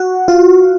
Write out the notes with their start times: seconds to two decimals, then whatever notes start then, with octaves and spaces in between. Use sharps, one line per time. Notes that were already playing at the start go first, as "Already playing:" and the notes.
Already playing: F#4
0.28 F4